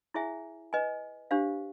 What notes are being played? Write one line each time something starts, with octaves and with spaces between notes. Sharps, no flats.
E4 G#4 C#5 E5 G#5
B4 D#5 G#5
D4 G4 C5 F5